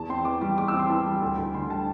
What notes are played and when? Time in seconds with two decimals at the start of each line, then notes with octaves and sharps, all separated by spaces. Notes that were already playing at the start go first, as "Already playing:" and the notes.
Already playing: E2 A5
0.09 C4 C6
0.25 E3 D6
0.41 G3 D6
0.58 E2 D6
0.68 E6
0.74 C4
0.79 C6
0.89 E3 A5
1.06 G3
1.22 D2
1.38 D2
1.54 D3 C6
1.70 G3 A5